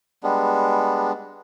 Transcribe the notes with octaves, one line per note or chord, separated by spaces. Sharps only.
G3 G#3 B3 D4